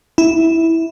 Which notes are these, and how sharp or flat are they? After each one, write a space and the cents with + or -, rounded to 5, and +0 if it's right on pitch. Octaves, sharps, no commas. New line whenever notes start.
E4 -10